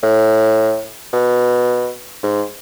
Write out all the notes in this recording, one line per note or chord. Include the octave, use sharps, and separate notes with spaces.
A2
B2
G#2